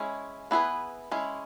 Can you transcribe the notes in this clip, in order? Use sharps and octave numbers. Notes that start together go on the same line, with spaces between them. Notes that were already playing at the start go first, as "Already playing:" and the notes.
Already playing: G#3 C#4 E4
B3 E4 G#4 B4
G#3 C#4 E4